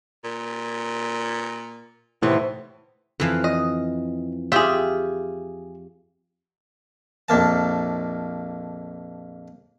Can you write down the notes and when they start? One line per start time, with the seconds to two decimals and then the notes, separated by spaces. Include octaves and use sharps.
0.24 A#2
2.22 D#2 A2 C3 E3 B3
3.20 F2 E3 F5
3.44 D#5
4.52 F4 G4 G#4 E5
7.29 A#1 F2 A#3 A5